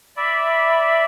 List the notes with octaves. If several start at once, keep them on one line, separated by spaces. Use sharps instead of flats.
D5 E5 B5